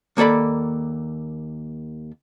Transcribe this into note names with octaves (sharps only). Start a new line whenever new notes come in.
D#2 A#3 A4 D5 B5